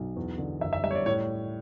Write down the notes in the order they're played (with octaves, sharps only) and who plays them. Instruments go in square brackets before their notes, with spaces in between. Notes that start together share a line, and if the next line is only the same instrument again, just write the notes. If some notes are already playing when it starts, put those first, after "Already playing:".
Already playing: [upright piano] B1
E2
D3
F#1 E5
E5
G3 E5
C#5
D5
A2 C#5